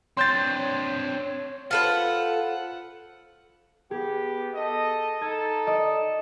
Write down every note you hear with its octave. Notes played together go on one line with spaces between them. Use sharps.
C4 D4 C#5 C6 G6 A6
F4 A4 B4 C5 F#5
B3 G4 G#4
A4 D#5
D#4 A4 G#6
D5 D#5